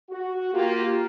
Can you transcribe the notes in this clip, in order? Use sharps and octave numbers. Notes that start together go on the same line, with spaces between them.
F#4
A#3 F4 G4